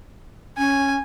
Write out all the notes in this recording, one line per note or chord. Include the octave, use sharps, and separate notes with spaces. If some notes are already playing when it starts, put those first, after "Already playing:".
C#4 G#5